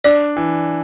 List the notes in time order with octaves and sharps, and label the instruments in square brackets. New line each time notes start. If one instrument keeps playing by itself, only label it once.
[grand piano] D4 [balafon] D5
[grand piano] E3